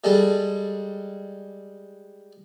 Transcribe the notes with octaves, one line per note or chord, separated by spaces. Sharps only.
G3 G#3 A4